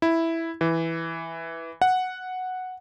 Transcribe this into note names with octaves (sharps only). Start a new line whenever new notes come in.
E4
E3
F#5